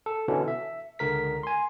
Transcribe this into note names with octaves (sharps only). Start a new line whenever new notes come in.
A4
B2 D3 E3 C#4 A4
E5
C#2 D3 A#4 B6
G#5 C6